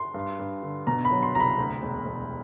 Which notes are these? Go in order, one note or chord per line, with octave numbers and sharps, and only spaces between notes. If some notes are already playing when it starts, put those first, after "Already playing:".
Already playing: C6
G2
G2
D3
B2 A#5
B5
F#3
C6
C2 A#5 B5
D2
E1
E1